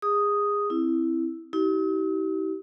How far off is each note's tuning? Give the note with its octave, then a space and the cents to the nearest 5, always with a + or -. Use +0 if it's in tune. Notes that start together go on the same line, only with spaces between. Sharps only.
G#4 -25 D#6 +0
C4 +0 E4 +0
D#4 +45 G4 -35